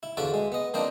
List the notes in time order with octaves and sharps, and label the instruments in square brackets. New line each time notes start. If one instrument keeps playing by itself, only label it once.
[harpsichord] E4
E2 D3 F4 F#4 D5 E5
G#3
B3 D#5
F3 A#3 C4 D4 C5 D#5